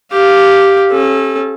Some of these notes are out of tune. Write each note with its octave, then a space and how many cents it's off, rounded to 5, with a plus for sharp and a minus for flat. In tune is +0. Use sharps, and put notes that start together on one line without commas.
G4 +0 F5 +0
C#4 -35 A4 -20